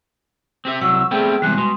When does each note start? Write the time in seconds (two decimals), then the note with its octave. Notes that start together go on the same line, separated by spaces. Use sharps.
0.65 C4 G4 E5
0.81 C2 F#3 F#5 C#6 E6
1.11 G3 A3 B3 C4 G#4 G5
1.42 E2 C3 G3 G#3 F#6
1.58 B2 C6